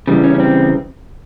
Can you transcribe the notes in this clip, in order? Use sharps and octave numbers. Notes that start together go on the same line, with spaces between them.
C#3 E3 G3
C#4
C#4
C4